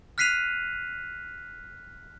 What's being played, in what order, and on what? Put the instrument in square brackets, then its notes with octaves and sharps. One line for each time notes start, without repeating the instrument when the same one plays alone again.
[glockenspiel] F6 F#6 B6 C7 D#7 F7